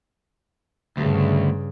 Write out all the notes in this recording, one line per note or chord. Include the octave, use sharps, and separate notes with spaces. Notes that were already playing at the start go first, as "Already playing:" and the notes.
D2 G2 C#3